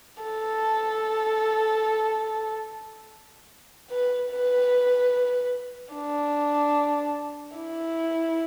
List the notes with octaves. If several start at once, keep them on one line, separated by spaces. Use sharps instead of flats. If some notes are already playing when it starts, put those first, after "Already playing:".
A4
B4
B4
D4
E4